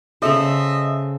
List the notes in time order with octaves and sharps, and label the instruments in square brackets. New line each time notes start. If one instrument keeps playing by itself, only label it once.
[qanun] C#3 A4 C5 [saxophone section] D#5 E5